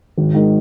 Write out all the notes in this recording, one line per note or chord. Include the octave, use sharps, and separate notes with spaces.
G#1
G#2 D#3 G#3